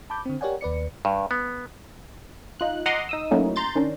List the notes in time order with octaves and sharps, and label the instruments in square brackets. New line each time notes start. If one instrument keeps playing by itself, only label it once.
[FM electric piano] A5 B5 D6 G6
D3 C4
G4 A#4 C#5 D5 F#5 G#5
D#2 B4 D5 C#7
[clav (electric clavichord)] G2
B3
[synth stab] D#4 F4 F#6
D#5 F#5 A#5 C6 D6 D#6
D#4 D#6 E6
F#3 A3 A#3 C#4 D#4 E4
A#5 C6 G6 A6
D#3 C#4 D4